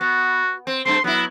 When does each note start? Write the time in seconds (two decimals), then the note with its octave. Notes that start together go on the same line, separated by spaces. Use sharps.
0.01 B3 F#4
0.67 C4
0.86 G2 A3 C4 C6
1.04 F#3 B3 E4